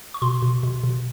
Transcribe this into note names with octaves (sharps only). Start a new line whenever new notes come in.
C#6
B2 C6
B2
B2
B2